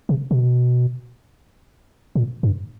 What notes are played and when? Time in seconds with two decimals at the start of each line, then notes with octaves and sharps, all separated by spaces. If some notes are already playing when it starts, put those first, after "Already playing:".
0.09 C3
0.31 B2
2.15 A#2
2.43 G2